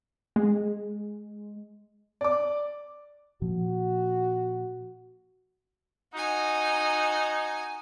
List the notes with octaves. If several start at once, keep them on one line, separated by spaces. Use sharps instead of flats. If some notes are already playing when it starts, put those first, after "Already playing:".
G#3
D5 D6
A#2 F3 F#4
D#4 F#4 G#5